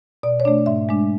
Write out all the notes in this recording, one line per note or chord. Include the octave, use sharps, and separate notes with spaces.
B2 D5
C#5
A3 D4 D5
G#2 E5
G#3 D4